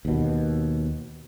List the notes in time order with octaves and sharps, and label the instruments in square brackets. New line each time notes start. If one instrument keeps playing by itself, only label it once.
[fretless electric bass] D#2 B2